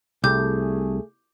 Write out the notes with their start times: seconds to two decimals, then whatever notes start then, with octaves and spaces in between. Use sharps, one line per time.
0.24 C2 A3 G#4 D6 G6